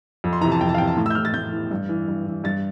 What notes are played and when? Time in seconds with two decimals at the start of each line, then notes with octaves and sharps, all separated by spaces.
0.24 F2
0.33 C6
0.41 E3 A#5
0.45 C3
0.52 A5
0.61 F2 G5
0.69 A5
0.74 F5
0.78 C3 E3 G5
0.87 A5
0.97 A2
1.06 E6
1.10 G6
1.15 E3 F6
1.25 A6
1.34 A2 G6
1.52 E3
1.71 G2
1.89 E3
2.08 G2
2.27 E3
2.44 G2 A6